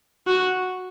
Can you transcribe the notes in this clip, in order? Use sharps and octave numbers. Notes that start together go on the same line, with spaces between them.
F#4